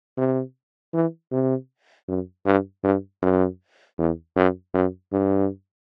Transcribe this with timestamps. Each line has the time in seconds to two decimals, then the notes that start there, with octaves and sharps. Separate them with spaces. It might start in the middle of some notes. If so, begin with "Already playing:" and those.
0.18 C3
0.94 E3
1.32 C3
2.08 F#2
2.45 G2
2.84 G2
3.22 F#2
3.99 E2
4.36 F#2
4.74 F#2
5.12 G2